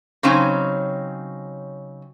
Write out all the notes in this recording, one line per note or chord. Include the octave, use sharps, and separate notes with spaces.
C#3 F#3 C4 C#4 D#4